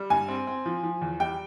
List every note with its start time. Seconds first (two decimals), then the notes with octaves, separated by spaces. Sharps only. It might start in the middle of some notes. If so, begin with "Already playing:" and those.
Already playing: G3
0.10 G2 G#5
0.28 C4
0.47 C4
0.66 F3
0.84 F3
1.01 E2
1.20 G3 G5